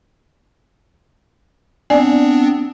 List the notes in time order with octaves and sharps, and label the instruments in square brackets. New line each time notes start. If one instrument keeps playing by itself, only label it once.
[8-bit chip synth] B3 C4 D4 [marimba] D5 G#5